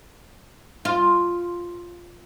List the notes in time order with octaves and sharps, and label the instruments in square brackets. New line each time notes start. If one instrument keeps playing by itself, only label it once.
[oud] F4